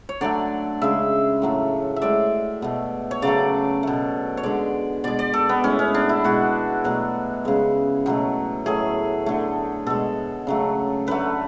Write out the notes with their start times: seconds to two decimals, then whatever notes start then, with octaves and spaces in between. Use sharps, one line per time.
0.09 C#5
0.21 D3 F#3 A3 D5
0.82 C#3 G#3 E5
1.42 A2 F#3 A3
1.96 E5
2.02 A2 G#3 D5
2.62 B2 A3
3.11 C#5
3.22 C#3 F#3 A3 D5
3.83 B2 A3
4.37 C#5
4.43 D3 G#3 D5
5.04 B2 G#3 D5
5.19 D5
5.34 A4
5.49 B3
5.64 A2 G#3 C#4
5.79 C#4
5.94 D4
6.09 E4
6.24 B2 G#3 F#4
6.84 B2 F#3 A3
7.45 C#3 G#3
8.06 B2 F#3 A3
8.66 A2 F#3 A3 G#4
9.26 D3 A3
9.86 B2 G#3 A4
10.47 C#3 F#3 A3
11.07 D3 F#3 A3 B4